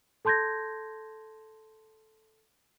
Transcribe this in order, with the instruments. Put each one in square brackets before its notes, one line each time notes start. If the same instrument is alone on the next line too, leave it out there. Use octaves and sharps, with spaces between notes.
[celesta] A4 A5 C6 G6 G#6 A#6